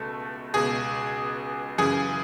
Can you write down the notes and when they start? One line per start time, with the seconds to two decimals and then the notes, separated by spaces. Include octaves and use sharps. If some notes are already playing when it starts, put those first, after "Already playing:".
Already playing: C#2 B2 A3
0.54 C#2 B2 G#4
1.78 F#2 C#3 E3 G#4